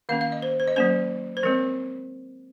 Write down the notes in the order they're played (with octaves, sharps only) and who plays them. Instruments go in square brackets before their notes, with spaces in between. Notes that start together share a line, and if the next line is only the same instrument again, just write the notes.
[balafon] D#3 A#3 C#4 F5
F5
D#5
C5
C5
D#5
F#3 A#3 C#4 C5
C5
F3 G#3 C4 A#4